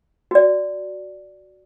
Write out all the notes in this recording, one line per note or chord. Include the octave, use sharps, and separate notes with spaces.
F#4 D5